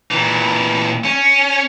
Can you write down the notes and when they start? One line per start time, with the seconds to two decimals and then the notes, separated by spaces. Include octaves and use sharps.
0.11 A#2 E3
1.05 C#4